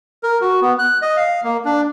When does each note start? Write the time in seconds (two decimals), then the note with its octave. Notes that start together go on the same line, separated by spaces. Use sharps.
0.23 A#4
0.41 F#4
0.61 B3
0.79 F#6
1.02 D#5
1.17 F5
1.44 A#3
1.65 D4